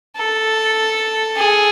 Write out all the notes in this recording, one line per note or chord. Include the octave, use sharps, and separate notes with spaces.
A4
G#4